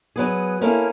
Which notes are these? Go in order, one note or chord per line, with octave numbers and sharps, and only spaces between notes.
F#3 B3 G#4
A#3 C#4 E4 A4 F5